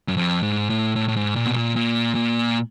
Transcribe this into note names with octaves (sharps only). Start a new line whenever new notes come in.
F#2
F2
G#2
A2
A2
A2
G#2
A#2
B2
A#2
A#2
A#2